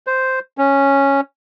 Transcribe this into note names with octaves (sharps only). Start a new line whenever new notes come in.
C5
C#4